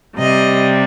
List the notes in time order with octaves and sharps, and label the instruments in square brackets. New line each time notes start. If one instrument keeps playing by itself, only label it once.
[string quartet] C3 G3 D#5